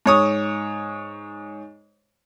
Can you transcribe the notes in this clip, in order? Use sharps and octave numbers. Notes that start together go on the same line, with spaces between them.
G#2 C#5 D#6